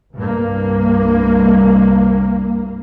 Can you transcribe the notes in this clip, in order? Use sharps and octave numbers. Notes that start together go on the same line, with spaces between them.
C2 G2 A#3